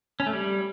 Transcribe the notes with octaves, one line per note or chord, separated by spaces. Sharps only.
C#4
A3
G3